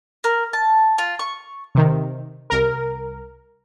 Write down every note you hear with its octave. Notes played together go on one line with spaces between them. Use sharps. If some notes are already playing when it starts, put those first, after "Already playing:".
A#4
A5
F4
C#6
C3 D#3
C2 A#4